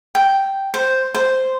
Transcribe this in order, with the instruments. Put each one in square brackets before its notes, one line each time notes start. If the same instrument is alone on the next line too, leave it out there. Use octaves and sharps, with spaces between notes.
[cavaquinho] G5
C5
C5